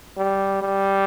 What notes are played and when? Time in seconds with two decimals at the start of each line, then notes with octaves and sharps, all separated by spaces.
0.17 G3
0.62 G3